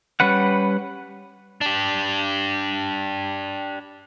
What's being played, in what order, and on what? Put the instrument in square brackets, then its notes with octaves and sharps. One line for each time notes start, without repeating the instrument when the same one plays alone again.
[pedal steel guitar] G3 C#4 B4 F#5
[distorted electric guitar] D4 G4